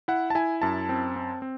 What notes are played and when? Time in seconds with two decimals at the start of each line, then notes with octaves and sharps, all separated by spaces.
0.08 E4 F#5
0.30 A5
0.35 E4 G#5
0.62 F#2 A5
0.89 C4
1.16 C4
1.42 C4